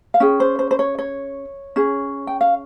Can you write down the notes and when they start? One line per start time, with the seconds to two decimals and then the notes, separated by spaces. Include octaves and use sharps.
0.14 F5
0.20 C#4 G#4 G5
0.40 C5
0.59 C5
0.71 C5
0.79 C#5
0.98 C#5
1.76 C#4 G#4
2.27 G5
2.41 F5